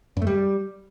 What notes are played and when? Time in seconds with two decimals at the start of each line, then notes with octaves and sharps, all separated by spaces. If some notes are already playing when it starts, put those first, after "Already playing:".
0.17 F#2
0.22 A3
0.27 G3